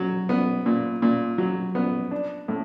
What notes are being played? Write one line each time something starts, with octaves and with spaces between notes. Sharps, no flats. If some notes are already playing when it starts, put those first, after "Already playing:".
Already playing: F#3
B3
A#2
A#2
F#3
B3
D4
A2